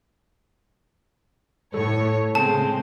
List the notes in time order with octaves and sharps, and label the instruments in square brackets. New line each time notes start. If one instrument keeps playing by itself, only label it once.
[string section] A2 C#5 [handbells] A4
[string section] C#3 [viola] G#3 C4 [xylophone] A5